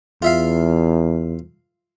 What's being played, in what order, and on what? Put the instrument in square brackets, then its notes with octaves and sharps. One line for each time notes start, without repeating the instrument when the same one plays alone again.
[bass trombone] E2 [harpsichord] F4 E5 F5